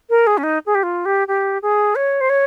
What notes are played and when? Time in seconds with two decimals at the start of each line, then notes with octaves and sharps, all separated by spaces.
0.10 A#4
0.27 G#4
0.38 C#4
0.43 D#4
0.66 G#4
0.75 G4
0.83 F4
1.05 G4
1.28 G4
1.62 G#4
1.95 C#5
2.21 C5
2.30 C#5